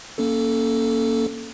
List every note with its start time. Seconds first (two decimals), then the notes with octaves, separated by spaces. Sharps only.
0.18 A#3 C#4 A4